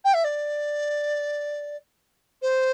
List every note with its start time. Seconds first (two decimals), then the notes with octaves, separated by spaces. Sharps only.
0.04 G5
0.14 E5
0.24 D5
2.42 C5